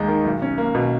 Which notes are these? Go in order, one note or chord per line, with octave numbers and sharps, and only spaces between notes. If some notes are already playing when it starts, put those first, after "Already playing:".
Already playing: D#2 G#3 D#4
D#3
B1
C#4
A#3
B2